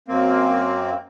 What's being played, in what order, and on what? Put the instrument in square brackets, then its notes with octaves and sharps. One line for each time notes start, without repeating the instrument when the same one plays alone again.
[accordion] F#2 A#3 C4